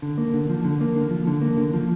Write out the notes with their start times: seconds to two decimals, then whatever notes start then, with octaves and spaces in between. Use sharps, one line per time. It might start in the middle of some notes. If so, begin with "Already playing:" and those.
0.02 D3
0.18 A#3
0.34 D3
0.50 F3
0.64 D3
0.81 A#3
0.96 D3
1.11 F3
1.27 D3
1.42 A#3
1.57 D3
1.74 F3